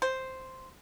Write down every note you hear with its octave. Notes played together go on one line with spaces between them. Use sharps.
C5